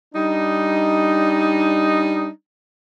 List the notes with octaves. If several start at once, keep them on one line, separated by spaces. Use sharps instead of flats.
G3 D4 D#4